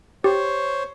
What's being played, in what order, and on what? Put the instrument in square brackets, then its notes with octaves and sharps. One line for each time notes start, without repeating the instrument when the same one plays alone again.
[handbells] G4 [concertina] C5 C#5